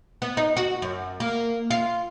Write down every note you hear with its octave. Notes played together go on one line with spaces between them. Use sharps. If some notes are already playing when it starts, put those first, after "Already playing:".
B3
D#4
F#4
F#2
A#3
F4